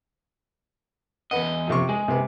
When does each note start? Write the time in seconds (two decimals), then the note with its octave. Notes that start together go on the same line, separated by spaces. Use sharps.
1.31 E2 B4 D#5 F#5
1.68 F2 C3 C#6
1.89 G#3 G#4
2.08 C3 B4